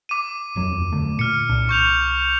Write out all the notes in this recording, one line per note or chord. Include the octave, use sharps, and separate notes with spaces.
D6 D#7
D#1 F2 F#3
D3 A3
A#2 F6 C#7
C2 D4
C#6 G6 F7